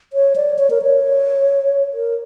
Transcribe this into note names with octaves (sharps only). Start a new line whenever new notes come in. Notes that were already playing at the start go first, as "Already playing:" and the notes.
C#5
D5
C#5
A#4
C#5
A#4